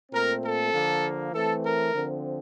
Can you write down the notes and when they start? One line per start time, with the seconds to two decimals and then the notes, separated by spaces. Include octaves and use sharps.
0.12 A#2 A3 C4 A#4
0.42 A4
0.72 D3 F3 A#3
1.33 E3 A3 C4 A4
1.63 A#4
1.94 D3 F3 C4